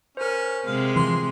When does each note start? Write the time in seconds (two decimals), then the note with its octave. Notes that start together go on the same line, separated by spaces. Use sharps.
0.17 C#4 A#4 C5
0.66 C3 G#3 F5
0.96 E3 F3 C6